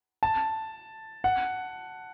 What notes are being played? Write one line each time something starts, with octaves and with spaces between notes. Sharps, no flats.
A5
F#5